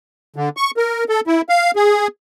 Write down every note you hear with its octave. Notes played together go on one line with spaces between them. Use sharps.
D3
C#6
A#4
A4
E4
F5
G#4